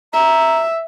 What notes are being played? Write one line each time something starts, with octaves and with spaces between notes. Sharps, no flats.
E5 A#5